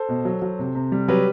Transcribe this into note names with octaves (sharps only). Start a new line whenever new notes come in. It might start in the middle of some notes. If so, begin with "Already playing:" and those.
Already playing: A4 C5
B2
F#3
F#3
C3
C3
G3
F#3 G4 B4